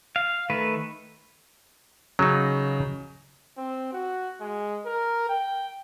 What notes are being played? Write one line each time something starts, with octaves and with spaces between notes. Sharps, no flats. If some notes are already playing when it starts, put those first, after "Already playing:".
F5
D#3 A3 B4
C#3 F#3 D#4
C4
F#4
G#3
A#4
G5